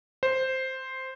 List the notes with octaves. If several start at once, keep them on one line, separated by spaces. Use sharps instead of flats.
C5